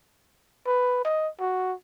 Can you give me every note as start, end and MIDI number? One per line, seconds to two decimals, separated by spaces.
0.67 1.05 71
1.05 1.28 75
1.40 1.73 66